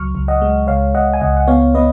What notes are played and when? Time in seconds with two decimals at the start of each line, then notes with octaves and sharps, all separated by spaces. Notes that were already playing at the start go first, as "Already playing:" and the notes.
Already playing: C#2 F#3 C#6 F6
0.15 C#2
0.28 D#5 F#5
0.42 G#3
0.67 C#2 C#5 F5
0.94 C#2 D#5 F#5
1.13 G#5
1.21 C#2 D#5 F#5
1.37 F#5
1.48 B3 C#5 F5
1.74 B3 B4 D#5